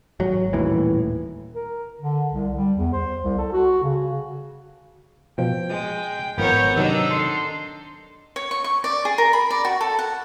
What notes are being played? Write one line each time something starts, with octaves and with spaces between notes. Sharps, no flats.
G#1 F#3
D#1 D#2 A2 E3
A#4
D3
C2
G3
E2
C5
C2
A4
F#4
C#3
B2 F3 G5
G#3
G#1 F3 B3 A#4 C#5 A#5 G6
C3 D#3 F#3 D4 D#4 E6
A4 C6
C#5
C#6
C#6
D5
G#4
A#4
B5
D5
F#4
A4
F#5